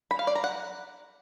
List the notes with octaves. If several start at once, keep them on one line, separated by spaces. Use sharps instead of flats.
B5
F5
D5
A#5
F#5